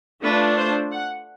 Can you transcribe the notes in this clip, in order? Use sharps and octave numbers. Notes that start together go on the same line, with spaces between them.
A3 D4 F4 B4
C5
F#5